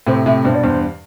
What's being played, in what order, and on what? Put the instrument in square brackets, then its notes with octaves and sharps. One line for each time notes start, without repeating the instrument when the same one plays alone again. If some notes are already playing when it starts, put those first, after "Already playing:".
[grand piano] A2 C3 [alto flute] C5
[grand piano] A2 C3 [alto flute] E5
[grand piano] G2 B2 [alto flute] C5
[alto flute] D5
[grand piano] E2 G2 [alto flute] C5